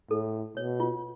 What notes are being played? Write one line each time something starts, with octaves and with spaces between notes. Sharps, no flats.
A2 A4
B2 C#5
F4